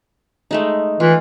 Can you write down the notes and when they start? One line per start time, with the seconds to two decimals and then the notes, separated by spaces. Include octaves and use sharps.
0.51 G#3 A3 D#4
1.00 E3 F4